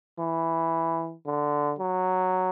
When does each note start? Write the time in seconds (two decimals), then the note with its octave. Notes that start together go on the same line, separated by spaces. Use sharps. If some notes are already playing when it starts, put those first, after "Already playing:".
0.19 E3
1.26 D3
1.79 F#3